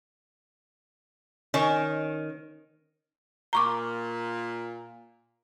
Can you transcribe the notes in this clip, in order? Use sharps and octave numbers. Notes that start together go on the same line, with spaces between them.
D#3 C#4
A#2 A#5 C#6 D6